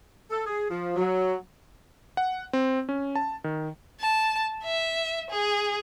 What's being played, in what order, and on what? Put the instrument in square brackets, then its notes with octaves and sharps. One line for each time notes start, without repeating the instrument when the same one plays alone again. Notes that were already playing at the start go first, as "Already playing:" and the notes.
[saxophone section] A4
G#4
F3
F#3
[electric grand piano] F#5
C4
C#4
A5
D#3
[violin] A5
E5
G#4